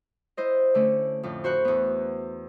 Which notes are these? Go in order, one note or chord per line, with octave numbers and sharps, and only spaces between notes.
E4 C5 D#5
D3 A3 C#4
F2 A2
F#4 C5 B5 C#6 F#6
E2 B3